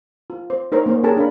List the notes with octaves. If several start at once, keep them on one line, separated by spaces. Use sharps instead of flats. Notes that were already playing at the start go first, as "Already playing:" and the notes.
F4
C5
D#4 A#4 C5 C#5 A#5
A#3 C#4 C5 C#5
C#4 G4 G#4 A#4 G#5 A5
D4 A#4 C#5 F5 B5